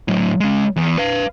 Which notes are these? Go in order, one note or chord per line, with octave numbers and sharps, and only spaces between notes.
A2 F#3
G#3 C#4
E2
B4 F5